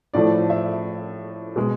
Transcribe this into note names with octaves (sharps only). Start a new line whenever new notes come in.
A2 F3 A3 D5
E5
B2 G#3